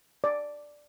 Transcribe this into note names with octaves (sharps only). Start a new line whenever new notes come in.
D5